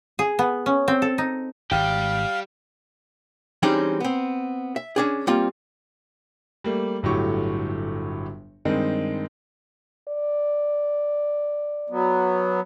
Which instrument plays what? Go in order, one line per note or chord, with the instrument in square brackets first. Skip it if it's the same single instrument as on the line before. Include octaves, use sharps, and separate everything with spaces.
[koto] G#4
B3
C#4
C4
A4
D#4
[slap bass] G#1 G#2 [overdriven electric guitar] G3 G4 [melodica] F5 [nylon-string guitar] G5
[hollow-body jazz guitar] E3 G3 G#3 C4 C#4 D#4
B3 C4
E5
C#4 D4 G#4
G3 A#3 C4 F4
[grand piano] G3 A3 A#3
G1 A2 F#3 G4 C#6
G2 D#3 G#3 C4 D#4
[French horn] D5
[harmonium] F#3 B3